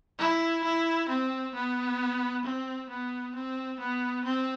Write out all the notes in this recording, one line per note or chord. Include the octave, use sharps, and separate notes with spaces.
E4
E4
C4
B3
C4
B3
C4
B3
C4